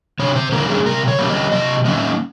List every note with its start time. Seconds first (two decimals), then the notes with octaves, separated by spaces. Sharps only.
0.19 C3 C#5
0.36 C5
0.52 G3 A#3 C#4 A#4
0.69 G#4
0.86 C3 A#4
1.08 C#5
1.19 G3 A#3 C#4
1.30 D#5
1.52 C3 D#5
1.85 G3 A#3 C#4 D#5